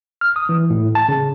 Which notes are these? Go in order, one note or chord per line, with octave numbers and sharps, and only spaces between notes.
F6
D#6
E3
A2
A5
C#3